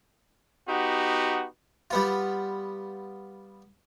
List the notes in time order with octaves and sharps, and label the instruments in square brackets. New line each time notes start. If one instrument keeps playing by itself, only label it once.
[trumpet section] B3 D#4 F#4 G4
[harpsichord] G3 B3 F4